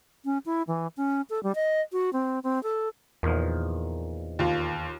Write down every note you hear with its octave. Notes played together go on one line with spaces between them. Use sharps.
C#4
E4
E3
C#4
A4
G3
D#5
F#4
C4
C4
A4
E2 A#2 D#3 F3
D#2 F4